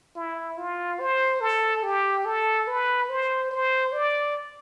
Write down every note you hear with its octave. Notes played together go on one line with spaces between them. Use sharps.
E4
F4
C5
A4
G4
A4
B4
C5
C5
D5